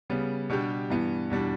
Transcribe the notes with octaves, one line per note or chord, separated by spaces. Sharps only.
C#3 G3 B3
B2 G3 D4 G4
G2 E3 B3
E2 B2 G3 D4